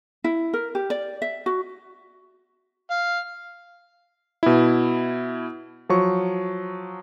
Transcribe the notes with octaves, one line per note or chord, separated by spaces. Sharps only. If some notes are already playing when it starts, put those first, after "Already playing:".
E4
A#4
G4
D5
E5
F#4
F5
B2 E4
F3 F#3 C#6